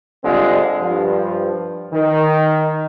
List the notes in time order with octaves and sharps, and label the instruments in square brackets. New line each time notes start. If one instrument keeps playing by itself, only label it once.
[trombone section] D3 G3 G#3 C4 F4 G#4
G2 F3
D#3